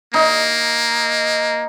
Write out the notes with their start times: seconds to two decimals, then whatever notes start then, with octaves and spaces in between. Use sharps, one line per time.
0.14 A#3 D#4